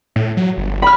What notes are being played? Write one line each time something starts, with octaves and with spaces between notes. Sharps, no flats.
A2
F#3
G1
B5 F6